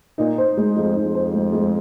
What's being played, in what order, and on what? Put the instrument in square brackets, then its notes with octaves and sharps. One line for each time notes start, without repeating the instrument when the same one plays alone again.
[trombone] A#2 [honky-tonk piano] D#4
[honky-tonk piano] C5
G#3
[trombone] F2 [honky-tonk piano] G#3
[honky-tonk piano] D#4
[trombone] F2
[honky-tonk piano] C5
G#3
G#3